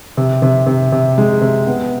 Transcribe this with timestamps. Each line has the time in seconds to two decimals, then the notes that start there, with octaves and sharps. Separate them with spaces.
0.17 C3
0.42 C3
0.67 C3
0.92 C3
1.18 G#3
1.42 C3
1.67 B3